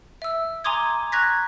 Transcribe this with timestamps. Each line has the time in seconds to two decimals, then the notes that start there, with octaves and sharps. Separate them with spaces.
0.22 E5 E6
0.64 G#5 A#5 C6 D6 D#6 G#6
1.12 A#5 C#6 F#6 G#6 A#6 B6